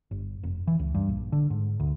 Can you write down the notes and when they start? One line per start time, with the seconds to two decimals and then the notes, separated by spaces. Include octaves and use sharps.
0.11 G1
0.43 F1
0.67 E3
0.79 C#2
0.95 G2
1.09 A#1
1.32 D3
1.50 G#2
1.80 D2